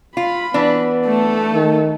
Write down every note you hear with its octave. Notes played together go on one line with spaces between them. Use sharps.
F4 B5
E3 B3 D4
A3 A4
D#3